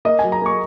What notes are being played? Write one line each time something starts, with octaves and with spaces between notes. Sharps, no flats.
A#3 D#5
F#3 G#5
A#5
A#3 C#6